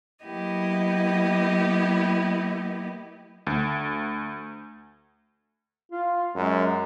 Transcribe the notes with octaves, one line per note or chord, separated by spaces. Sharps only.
F#3 A#3 B3 E4 G4 D#5
D2
F4
F#2 G#3